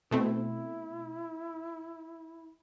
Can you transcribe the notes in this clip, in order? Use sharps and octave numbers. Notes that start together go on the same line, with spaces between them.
B2 A3 C4 E4